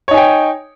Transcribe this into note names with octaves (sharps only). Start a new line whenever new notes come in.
D#4 C#5 G5 G#5